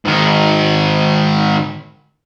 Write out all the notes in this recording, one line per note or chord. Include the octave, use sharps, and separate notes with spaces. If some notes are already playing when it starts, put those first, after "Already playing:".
G#2 D#3